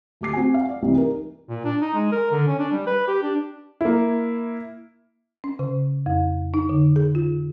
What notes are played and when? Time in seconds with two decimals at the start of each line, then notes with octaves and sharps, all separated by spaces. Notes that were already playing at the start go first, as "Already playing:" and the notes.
0.21 D2 G4 D6 C7
0.33 C4 F#4 G#5
0.54 F5
0.69 D5
0.82 C2 C3 E3
0.96 D#4 A#4
1.49 A#2
1.64 D4
1.81 D#4
1.94 G#3
2.12 A#4
2.31 D3
2.47 C#4
2.59 D4
2.72 G3
2.87 B4
3.07 G4
3.22 D4
3.81 A#3 E4
5.44 C#4
5.59 C#3
6.06 F2
6.54 D#4
6.69 D3
6.96 G#4
7.15 F4